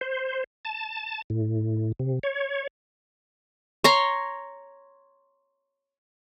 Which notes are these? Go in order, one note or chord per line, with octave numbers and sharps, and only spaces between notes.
C5
A5
A2
C3
C#5
C#5 A#5 C6